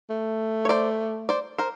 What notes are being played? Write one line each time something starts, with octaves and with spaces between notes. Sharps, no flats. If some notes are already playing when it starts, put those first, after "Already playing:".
A3
C#5
C5 D5
C5 D5
A#4 C5